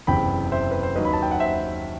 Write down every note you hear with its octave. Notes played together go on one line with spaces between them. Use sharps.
F#1 E2 C3 E3 G5 B5
C5 E5
B4
C5
D#2 D#3 F#3 B4 D#5
B5
A5
G5
F#5
C5 E5